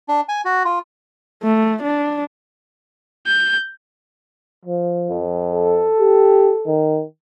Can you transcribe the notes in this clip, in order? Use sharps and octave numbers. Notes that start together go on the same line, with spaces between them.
D4
G#5
F#4
F4
A3
D4
G6
F3
F2
A4
G4
D#3